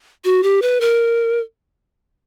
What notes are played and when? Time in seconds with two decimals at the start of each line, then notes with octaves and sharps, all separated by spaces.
0.25 F#4
0.43 G4
0.62 B4
0.81 A#4